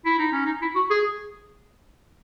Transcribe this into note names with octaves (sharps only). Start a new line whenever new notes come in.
E4
D#4
C#4
D#4
E4
F#4
G#4